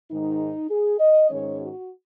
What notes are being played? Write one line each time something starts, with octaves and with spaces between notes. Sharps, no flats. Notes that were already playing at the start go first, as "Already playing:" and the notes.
G#2 D#3 G#3 D#4
G#4
D#5
G#2 D#3 G#3 C#4 C#5
F#4